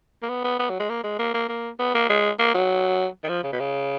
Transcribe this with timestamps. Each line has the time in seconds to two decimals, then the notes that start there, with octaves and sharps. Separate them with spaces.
0.22 A#3
0.29 B3
0.44 B3
0.59 B3
0.70 F#3
0.79 G#3
0.90 A#3
1.04 G#3
1.19 A#3
1.34 A#3
1.49 A#3
1.79 B3
1.95 A#3
2.09 G#3
2.39 A#3
2.54 F#3
3.24 D#3
3.29 F3
3.43 C#3
3.53 B2
3.60 C#3